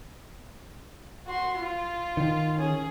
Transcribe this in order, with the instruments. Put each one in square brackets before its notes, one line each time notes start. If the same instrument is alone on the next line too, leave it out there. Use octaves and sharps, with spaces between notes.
[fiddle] F#4 C6
F4
[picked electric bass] D#3
[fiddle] C#4 G#4